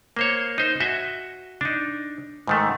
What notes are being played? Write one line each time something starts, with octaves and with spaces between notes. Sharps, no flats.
A#3 C5 C#5
D#4 C5
F#4 D#5 E5 G#5
D4 D#4
G#2 D#3 A3